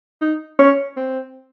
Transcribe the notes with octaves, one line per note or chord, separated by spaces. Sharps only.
D#4
C#4
C4